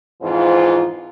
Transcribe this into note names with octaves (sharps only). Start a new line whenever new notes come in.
F2 G#2 E3 F3 F4